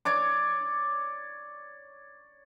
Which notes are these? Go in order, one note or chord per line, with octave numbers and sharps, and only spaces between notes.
C#5 D5 D6